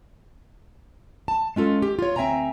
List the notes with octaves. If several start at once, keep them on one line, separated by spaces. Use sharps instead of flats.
A5
G#3 C#4 F4 A4
G4
F4 C#5
D2 C4 E5 G5 G#5 A#5